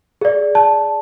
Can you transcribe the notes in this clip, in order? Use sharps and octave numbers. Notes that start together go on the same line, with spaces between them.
G#4 D5
A5